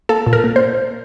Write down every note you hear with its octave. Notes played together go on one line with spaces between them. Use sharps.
A#3 A4
A#2
A#4
A#3
C5